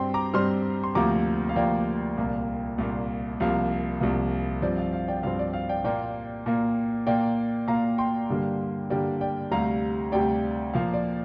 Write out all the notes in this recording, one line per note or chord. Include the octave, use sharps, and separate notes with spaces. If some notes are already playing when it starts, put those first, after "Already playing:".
Already playing: G2 G3 C4 G5 C6
A#5 D6
G2 G3 C4 C6 F6
C6
D2 C3 F3 A#3 A#5 D6
F5
D2 C3 F3 A#3 D5 G5
C2 A#2 A#3
C2 A#2 A#3 F5
C2 C3 F3 A#3 F5
C2 C3 F3 A#3
G2 F3 C4 D5
F5
F5
D5 G5
G2 F3 C4 F5
D5
F5
D5 G5
A#2 A#3 D5 G5
A#2 A#3
A#2 A#3 D5 G5
A#2 A#3 F5 A#5
G5 C6
G2 D3 G3 A#3
G2 D3 G3 A#3 D5 G5
D5 G5
D2 C3 G3 F5 A#5
D2 C3 G3 D5 G5
A#2 F3 A#3 F5
D5